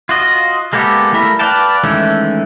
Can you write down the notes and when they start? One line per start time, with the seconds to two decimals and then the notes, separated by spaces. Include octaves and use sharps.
0.09 F4 F#4 D#5
0.73 G#3 A#3 B3 G4 A4
1.12 G3 A3 E4 A#4 B5
1.39 B4 D5 F5 G5 A5
1.83 D#3 E3 G#3 A3 C#4